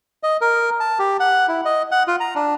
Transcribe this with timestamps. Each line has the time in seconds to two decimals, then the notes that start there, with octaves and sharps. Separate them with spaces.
0.23 D#5
0.41 A#4
0.80 A5
0.99 G4
1.20 F#5
1.48 E4
1.65 D#5
1.92 F#5
2.08 F4
2.20 A#5
2.36 D4